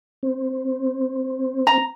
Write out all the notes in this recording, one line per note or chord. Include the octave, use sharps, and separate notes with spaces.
C4
A#5